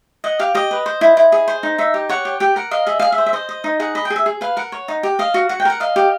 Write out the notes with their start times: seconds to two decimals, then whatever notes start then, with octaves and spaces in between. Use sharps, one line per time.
0.24 D#5 F#5
0.39 G4 F5
0.55 G4 D#5
0.71 B4
0.86 C5
1.01 E4
1.17 E4
1.32 G#4
1.48 C5
1.63 D#4
1.78 D#4 E5
1.94 G4
2.09 C#5 F#5
2.25 G4
2.40 G4 G5
2.56 A#4 F#5
2.71 D#5 F5
2.87 G#4 E5
3.00 G#4 F5
3.12 E5
3.18 C5
3.26 E5
3.33 C5 D#5
3.49 D#5
3.64 D#4
3.80 G#4 F#5
3.95 D#5 B5
4.05 G5
4.10 G#4
4.16 E5
4.26 G#4
4.41 B4 F5
4.57 A#4 F#5
4.72 C#5
4.88 D#4
5.03 G4
5.19 D#5 F5
5.34 F#4
5.49 F#4 F#5
5.60 G5
5.65 A#4 F#5
5.80 D#5 F5
5.96 G4